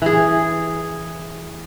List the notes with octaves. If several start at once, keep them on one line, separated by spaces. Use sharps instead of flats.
E3 G#4